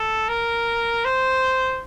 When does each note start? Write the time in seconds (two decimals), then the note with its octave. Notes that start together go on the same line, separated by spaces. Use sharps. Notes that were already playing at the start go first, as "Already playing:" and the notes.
Already playing: A4
0.28 A#4
1.05 C5